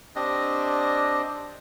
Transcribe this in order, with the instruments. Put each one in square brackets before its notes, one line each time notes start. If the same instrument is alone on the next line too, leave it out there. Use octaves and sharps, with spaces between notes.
[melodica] C4 D4 G4 D#5